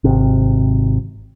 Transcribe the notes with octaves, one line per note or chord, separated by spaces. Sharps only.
G#1 C3